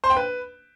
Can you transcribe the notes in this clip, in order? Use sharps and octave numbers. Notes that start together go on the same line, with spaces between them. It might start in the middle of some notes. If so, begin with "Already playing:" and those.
C5
G5
B4